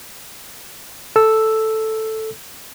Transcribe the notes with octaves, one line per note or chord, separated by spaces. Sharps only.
A4 E6